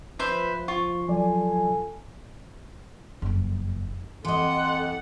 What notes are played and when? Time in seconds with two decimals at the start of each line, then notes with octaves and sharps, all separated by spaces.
0.19 F3 B4 C5 E5
0.68 F4 C#6
1.09 F3 F#3 A4 D5 G#5
3.22 F#1 F2
4.25 F2 E3 A4 D#5 F#5 C6